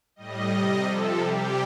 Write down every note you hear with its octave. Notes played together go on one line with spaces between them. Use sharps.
A2 G3 D#5
C3 G3 D#5
C3 F3 A4
C3 G3 G4